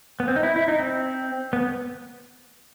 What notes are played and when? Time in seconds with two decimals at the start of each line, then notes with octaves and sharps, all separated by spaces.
0.20 B3
0.28 C4
0.36 D#4
0.43 E4
0.56 E4
0.68 D#4
0.79 C4
1.53 B3